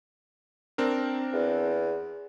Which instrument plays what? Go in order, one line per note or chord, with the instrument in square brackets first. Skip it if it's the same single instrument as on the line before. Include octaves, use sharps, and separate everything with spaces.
[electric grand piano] C4 D4 A#4
[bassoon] E2